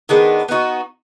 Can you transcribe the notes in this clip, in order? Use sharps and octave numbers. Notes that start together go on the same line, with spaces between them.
D#3 G#3 B3 D4
B3 D#4 F#4